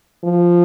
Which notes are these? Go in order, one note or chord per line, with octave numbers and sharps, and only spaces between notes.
F3